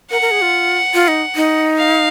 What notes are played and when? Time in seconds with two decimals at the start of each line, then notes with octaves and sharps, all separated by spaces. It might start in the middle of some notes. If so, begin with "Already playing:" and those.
0.11 A#4 F#5
0.21 A#4
0.31 G#4
0.42 F4
0.94 F4
1.08 D#4
1.35 D#4
1.78 F5